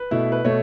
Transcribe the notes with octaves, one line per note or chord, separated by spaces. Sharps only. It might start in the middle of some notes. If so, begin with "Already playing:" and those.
Already playing: B4
B2 A3 E4
B4
B2 A3 C#5